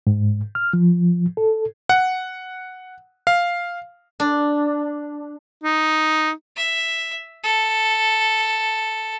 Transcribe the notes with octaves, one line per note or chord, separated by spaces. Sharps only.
G#2
F6
F3
A4
F#5
F5
D4
D#4
E5
A4